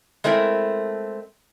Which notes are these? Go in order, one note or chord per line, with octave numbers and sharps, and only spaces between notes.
G#3 A3 C4 E4 A#4